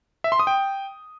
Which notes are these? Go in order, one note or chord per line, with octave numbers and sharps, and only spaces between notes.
E5
C6
D#6
G5